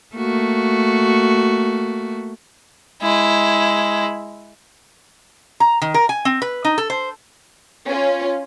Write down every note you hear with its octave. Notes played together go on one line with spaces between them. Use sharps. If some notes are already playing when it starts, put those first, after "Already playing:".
A3 A#3 F#4
G#3 E4
A#5
D#3
A#4
G#5
C4
B4
D#4
A4
C5
C#4 F4